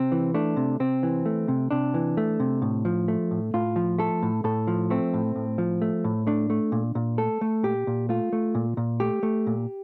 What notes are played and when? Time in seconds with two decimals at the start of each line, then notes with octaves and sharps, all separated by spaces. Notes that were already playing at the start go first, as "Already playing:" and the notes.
Already playing: C3 C4
0.12 E3
0.34 A3 D4
0.57 C3
0.80 C3 C4
1.03 E3
1.26 A3
1.48 C3
1.71 C3 D4
1.94 E3
2.17 A3
2.40 C3
2.62 A2
2.85 F3
3.08 A3
3.31 A2
3.54 A2 F4
3.76 F3
3.99 A3 A4
4.22 A2
4.44 A2 A4
4.67 F3
4.90 A3 C4
5.14 A2
5.36 A2
5.58 F3
5.82 A3
6.04 A2
6.27 A3 D4
6.50 A3
6.72 A#2
6.95 A#2
7.18 A3 A4
7.41 A3
7.63 A#2 G4
7.87 A#2
8.09 A3 F4
8.33 A3
8.55 A#2
8.77 A#2
9.00 A3 G4
9.23 A3
9.47 A#2